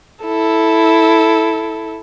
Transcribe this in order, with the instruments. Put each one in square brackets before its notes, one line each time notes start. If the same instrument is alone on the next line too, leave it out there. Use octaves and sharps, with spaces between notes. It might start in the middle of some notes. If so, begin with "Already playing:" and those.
[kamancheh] E4 A4